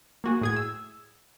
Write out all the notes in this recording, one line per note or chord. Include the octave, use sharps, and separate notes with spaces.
A#3 F#4 G#4
A2 G#4 G#6
E6